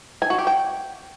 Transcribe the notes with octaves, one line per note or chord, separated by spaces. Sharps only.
G#5
F#4
G4
G5